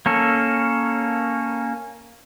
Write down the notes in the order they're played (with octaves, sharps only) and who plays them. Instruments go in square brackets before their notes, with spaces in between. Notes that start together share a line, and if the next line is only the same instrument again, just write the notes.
[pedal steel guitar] A#3 C#4 A4